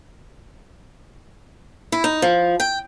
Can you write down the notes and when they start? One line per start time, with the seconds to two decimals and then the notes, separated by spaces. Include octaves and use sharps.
1.92 E4
2.04 D#4
2.22 F3
2.60 G5